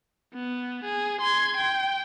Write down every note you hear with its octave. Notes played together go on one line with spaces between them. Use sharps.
B3
G#4
C6 G#6
G5